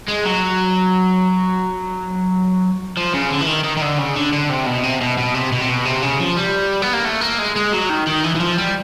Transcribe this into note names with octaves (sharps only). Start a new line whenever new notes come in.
G#3
F#3
F3
C#3
D3
E3
D#3
D#3
D#3
D3
C#3
D3
D3
C3
B2
C3
B2
B2
C3
B2
C3
B2
C3
C#3
F3
G3
B3
A#3
A3
A#3
G#3
G#3
F#3
D#3
D#3
E3
E3
F3
G3